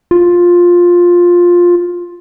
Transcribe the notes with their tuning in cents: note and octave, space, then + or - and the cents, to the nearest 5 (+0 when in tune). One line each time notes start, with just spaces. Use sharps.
F4 +10